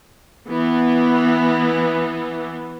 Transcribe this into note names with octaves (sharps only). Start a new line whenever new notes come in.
E3 B3